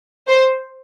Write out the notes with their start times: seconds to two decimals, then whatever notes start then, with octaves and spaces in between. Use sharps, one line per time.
0.28 C5